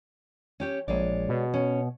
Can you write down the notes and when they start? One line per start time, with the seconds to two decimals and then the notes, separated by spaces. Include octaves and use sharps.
0.60 C#4 G4 C#5
0.88 A#1 G#3 C#5 D5
1.29 B2
1.54 C#4